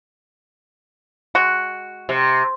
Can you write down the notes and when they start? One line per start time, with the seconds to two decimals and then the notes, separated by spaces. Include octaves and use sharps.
1.35 G#3 F#4
2.09 C3